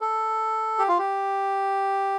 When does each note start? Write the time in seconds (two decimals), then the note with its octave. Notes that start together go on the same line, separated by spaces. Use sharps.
0.01 A4
0.79 G4
0.88 F4
0.98 G4